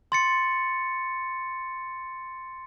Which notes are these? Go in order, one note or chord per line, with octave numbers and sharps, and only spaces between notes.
C6 A6 C#7